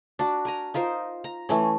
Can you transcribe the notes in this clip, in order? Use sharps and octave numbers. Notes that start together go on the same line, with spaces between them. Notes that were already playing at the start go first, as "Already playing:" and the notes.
D4 F#4
A#4 G#5 A#5
D#4 F4 A#4 C5
A#5
E3 A3 C#4